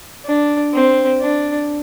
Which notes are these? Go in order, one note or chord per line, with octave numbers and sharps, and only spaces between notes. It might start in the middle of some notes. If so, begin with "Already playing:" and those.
D4
C4
D4